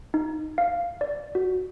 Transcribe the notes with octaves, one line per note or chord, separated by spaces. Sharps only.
D#4
F5
D5
F#4